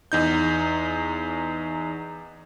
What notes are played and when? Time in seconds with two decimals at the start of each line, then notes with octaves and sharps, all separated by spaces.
0.12 E2 D#4 G6